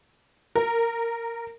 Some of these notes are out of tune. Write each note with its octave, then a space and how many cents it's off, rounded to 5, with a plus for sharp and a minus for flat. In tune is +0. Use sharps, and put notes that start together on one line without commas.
A#4 -10